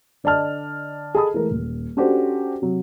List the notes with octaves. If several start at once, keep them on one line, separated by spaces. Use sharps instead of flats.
D3 D5 D#5 A5 F6
G#4 A4 D#5 A5 B5 D#6
E3 G#3 A3 A#4
D#1
C#4 D4 F#4 G4 A4 C5
C3 F#3